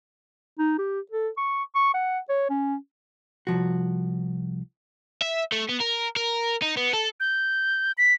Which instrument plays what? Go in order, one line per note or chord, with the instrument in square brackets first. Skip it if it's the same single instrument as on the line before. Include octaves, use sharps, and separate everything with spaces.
[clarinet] D#4
G4
A4
C#6
C#6
F#5
C#5
C#4
[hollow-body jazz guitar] C2 G2 F3 F#4
[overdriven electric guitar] E5
A3
B3
A#4
A#4
D#4
B3
A4
[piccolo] G6
B6